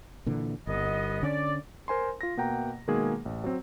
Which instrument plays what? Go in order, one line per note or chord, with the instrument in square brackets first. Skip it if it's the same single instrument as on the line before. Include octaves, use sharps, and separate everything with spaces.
[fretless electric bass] A#2 D3 E3
[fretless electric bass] G1 [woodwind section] C2 B3 D#5
[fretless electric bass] D3 C#4 [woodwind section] D5
[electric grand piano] A#4 C5 G#5 A#5 C6
F4 A#6
B2 A#3 F#5 G5 A#5
B2 D#3 G#3 A#3 G#4
A1
F#3 C4